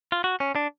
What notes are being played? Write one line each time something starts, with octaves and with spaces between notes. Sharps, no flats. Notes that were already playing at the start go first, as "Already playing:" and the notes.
F4
F#4
C#4
D4